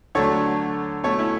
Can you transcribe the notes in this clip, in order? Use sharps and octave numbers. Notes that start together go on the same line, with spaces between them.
D3 F#3 A3 A4 C#5
B2 A3 A4 C#5
C#4 E4